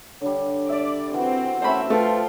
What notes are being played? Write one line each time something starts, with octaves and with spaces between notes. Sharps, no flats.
D3 G3 C#5
D5 E5 D6
E3 C4 F#4 F#5
A3 C4 C#4 C5 E5 B5
F3 A3 F4 B4 G5 C6